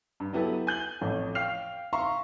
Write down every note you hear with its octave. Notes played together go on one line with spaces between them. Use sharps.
G2
F#3 B3 E4 G4 A4 B4
G#5 G6 F#7 G7
A1 F2 A2
F5 G5 F6 C7 F7
E5 F5 A#5 C6 C#6